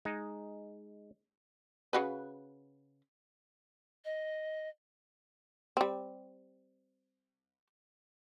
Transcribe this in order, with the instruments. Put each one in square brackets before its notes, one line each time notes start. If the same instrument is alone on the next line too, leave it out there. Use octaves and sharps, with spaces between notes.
[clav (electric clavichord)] G#3 D#4
[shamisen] C#3 F#4 B4
[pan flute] D#5
[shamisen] G3 C4